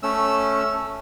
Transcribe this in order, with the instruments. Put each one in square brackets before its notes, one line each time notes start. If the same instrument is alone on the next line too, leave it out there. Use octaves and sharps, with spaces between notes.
[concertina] A3 C#4 E6